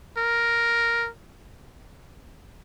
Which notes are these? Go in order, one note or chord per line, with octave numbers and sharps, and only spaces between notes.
A#4